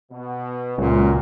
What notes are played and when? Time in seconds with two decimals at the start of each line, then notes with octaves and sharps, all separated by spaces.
0.12 B2
0.78 C#2 F#2 A#2 F#4